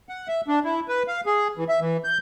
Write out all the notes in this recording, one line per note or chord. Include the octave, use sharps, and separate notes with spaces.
F#5
E5
D4
E4
B4
F5
G#4
E3
E5
E3
G6